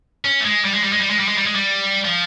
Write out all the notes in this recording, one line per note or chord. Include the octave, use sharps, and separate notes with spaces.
C#4
A3
G#3
G3
G#3
G3
G#3
G3
G#3
G3
G#3
G3
G#3
G3
F3